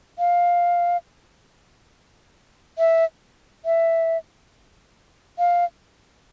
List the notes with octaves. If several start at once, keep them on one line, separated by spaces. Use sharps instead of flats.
F5
E5
E5
F5